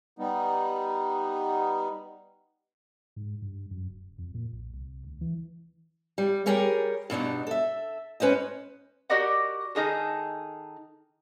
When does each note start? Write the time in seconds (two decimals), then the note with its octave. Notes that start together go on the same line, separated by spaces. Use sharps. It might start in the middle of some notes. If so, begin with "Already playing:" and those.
0.19 G3 B3 D#4
3.16 G#2
3.42 G2
3.71 F#2
3.90 D1
4.18 F2
4.34 A#2
4.53 A#1
4.73 C2
5.04 D2
5.21 E3
6.18 G3
6.46 G3 G4 G#4 A#4 C#5
7.10 G2 B2 D4 D#4
7.47 A4 E5
8.20 C#4 B4 C5 D#5
9.10 F#4 G4 A#4 D5 D#5 F#5
9.75 D#3 D#4 G#4 A4